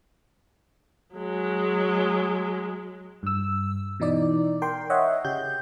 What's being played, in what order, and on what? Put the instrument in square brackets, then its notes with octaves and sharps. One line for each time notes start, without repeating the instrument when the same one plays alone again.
[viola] F#3 G#3
[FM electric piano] G2 E6
B2 E3 D#4 D5
A#4 G5 C6
C#5 D#5 E5 F#5
C#3 G4 G6